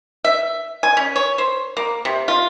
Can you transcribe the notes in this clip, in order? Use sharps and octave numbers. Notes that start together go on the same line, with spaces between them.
E5
G#5
C#4
C#5
C5
A#3
C3
F4